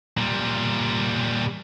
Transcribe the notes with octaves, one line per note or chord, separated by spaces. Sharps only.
A#2 G3